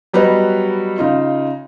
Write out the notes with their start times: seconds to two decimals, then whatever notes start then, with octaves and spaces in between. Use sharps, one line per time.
0.13 F#3 G3 B3 B4 C#5 D#5
0.98 C#3 D#4 F4